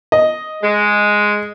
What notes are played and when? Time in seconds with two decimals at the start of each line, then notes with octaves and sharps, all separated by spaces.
0.12 D#5
0.62 G#3